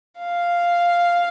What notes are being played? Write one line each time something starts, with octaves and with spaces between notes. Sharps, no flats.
F5